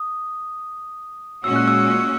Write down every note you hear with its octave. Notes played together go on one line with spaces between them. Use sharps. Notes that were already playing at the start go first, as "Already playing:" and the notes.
Already playing: D#6
A#2 G#3 C#4 F#4 E6
F#6
E6